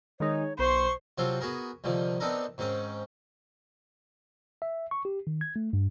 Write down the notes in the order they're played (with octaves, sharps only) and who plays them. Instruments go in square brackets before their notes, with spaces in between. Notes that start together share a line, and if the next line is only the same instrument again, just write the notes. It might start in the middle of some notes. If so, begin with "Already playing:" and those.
[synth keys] D#3 G#3 D#4 [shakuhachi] C#5
[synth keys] B1 [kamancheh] C5 C6 [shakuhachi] C#6
[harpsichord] C3 F#3 C4 F4 A4
B3 F#4 G#4 A#4
C2 D3 D#3 F3
B3 C4 D4 D#4 A4 A#4
G#2 D#3 C4 C#4
[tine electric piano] E5
C#6
G4
D#3
G#6
A3
G2